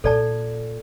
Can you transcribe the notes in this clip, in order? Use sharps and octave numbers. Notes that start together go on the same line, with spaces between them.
A#2 A4 D5 A5